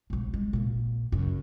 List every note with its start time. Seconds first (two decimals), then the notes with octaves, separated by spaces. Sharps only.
0.10 E1 A#1
0.34 G#3
0.53 A#1 A#2
1.12 F#2 C#3